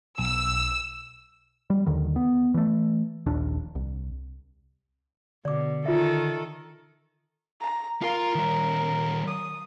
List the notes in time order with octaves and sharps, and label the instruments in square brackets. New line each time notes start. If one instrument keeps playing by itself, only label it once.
[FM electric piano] B1 [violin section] E6
[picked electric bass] G3
D#2 D3 D#3
B3
E3 A3
D#1 A#1 D#2 D4
C2
[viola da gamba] B2 [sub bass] D3 [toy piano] D5 D6
[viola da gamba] D#3 A4 [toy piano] F4 E5
[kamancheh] A#5
[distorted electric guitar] F4 F5 [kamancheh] A#4
[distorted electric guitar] D#3 G3
[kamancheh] D#6